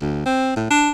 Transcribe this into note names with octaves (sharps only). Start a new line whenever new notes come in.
D2
C4
A2
D4